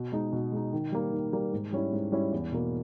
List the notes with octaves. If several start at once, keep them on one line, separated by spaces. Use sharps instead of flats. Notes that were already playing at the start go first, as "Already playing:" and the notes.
Already playing: B2
G#3 D#4
B2
G#3 D#4
D#3
G3 A#3
D#3
G3 A#3
G#2
G3 C#4 E4
G#2
G3 C#4 E4
E2
B2 A#3